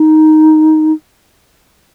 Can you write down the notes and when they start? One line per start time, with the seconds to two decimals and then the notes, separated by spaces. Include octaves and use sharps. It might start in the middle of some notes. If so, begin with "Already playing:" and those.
Already playing: D#4